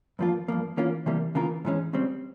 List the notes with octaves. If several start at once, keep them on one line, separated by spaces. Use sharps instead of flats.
G2 F3 A#3 F4
G2 F3 A#3
E3 A#3 C#4 F4
C3 E3 G3 A#3
C#3 E3 A#3 F4 A#4
G#2 E3 G#3 C#4
C#2 C#3 G3 C4